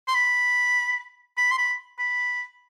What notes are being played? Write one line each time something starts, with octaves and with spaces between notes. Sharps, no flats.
C6
B5
B5
C6
B5
B5